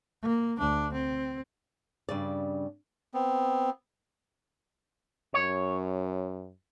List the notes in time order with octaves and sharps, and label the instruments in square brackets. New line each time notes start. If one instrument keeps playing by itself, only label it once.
[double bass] A#3
D2 D4
C4
[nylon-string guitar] G2 C#3 D5
[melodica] B3 C4
[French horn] F#2 [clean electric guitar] C#5